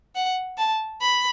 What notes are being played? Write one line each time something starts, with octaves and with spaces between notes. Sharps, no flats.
F#5
A5
B5